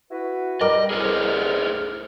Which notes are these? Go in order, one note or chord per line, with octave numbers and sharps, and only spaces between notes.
E4 F#4 B4
G3 A#4 D#5 D6
C2 G#4 A4 C5 F6